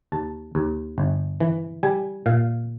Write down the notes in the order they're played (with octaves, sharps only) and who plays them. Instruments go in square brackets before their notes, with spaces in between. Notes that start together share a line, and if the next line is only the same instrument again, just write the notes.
[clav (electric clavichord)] D#2 A5
D#2
G1
E3
G3 G#5
A#2 F5